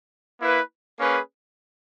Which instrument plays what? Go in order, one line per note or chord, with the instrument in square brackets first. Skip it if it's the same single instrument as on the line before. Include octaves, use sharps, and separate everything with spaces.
[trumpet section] A#3 E4 B4
A#3 C#4 G#4 B4